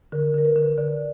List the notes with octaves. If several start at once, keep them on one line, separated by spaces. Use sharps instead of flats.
D3 A#4
D3 A#4
B4
D3
D3 D5